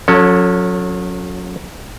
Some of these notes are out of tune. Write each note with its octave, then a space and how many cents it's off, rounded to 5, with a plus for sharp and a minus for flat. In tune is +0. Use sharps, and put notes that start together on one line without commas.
F#3 -35 C#4 +0 A4 +15